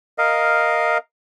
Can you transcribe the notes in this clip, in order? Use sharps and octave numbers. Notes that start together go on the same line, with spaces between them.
A#4 D#5 F5